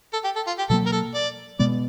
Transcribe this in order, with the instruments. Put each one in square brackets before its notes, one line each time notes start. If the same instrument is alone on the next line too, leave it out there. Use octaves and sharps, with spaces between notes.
[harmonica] A4
G4
A4
F4
G4
[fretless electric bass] B2 F#3 A#3 [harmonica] A4
[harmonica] A#4
A4
D5
[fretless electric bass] B2 G#3 B3 [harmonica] D5